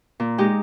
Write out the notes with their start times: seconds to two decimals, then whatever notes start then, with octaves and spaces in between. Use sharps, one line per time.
0.20 A#2
0.38 G#3 D#4 G4